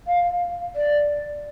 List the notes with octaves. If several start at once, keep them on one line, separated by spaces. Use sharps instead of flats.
F5
D5